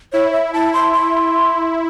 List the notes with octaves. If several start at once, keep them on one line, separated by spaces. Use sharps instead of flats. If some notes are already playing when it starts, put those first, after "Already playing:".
E4 C#5
E5
E4 A5
C6
C6